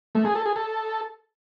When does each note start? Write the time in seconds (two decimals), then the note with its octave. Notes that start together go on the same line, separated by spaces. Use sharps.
0.15 A3
0.25 G#4
0.35 A4
0.46 G#4
0.56 A4